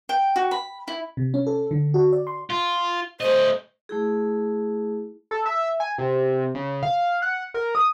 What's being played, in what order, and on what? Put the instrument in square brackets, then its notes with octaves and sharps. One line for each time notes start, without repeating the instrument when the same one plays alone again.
[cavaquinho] G5
F#4
B5
E4
[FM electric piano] C3
C#4
A4
D3
F#4
D5
C6
[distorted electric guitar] F4
[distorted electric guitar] A3 D#5 [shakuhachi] C5
[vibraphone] A3 E4 G#4
[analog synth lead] A4
E5
G#5
C3
C#3
F5
F#5
A#4
D#6